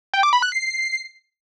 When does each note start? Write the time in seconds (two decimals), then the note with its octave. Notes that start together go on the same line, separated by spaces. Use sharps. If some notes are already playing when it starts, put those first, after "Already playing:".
0.14 G5
0.23 D6
0.33 B5
0.42 F#6
0.52 C7